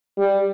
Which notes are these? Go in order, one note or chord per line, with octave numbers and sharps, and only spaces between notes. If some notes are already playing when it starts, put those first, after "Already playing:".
G3